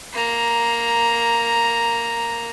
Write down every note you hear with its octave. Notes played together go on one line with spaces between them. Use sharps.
A#3 A#5